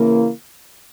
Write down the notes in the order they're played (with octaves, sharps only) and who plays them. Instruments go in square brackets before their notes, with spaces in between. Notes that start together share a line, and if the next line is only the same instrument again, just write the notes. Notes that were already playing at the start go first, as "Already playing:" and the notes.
Already playing: [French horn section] C#3 E3 A#3 E4